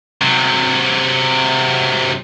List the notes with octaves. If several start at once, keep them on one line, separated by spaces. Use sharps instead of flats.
C3 F#3